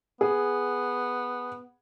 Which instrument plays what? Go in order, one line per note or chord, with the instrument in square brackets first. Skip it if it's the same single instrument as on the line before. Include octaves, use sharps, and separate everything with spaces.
[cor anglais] B3 [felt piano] G#4